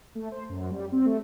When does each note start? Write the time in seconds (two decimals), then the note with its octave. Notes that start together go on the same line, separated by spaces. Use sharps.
0.15 A3
0.32 C5
0.49 F#2
0.71 G3
0.92 C4
1.05 A3